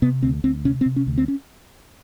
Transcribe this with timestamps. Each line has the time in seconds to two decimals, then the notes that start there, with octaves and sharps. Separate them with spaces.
0.02 C3 B3
0.23 D2 C4
0.44 D2 C4
0.65 C3 C#4
0.81 C4
0.86 C3
0.96 C#4
1.07 D2
1.18 C4
1.28 C#4